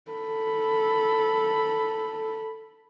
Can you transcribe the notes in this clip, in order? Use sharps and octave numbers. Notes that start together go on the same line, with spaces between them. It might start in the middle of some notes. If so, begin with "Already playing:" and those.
A4 B5